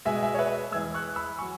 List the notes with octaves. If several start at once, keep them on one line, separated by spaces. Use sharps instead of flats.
B2 G#3 E5 G#5
E5 G#5
C#5
B4 E5
E2 E3 G#3 E6 G#6
C#6 F#6
B5 E6
F#3 G#5 C#6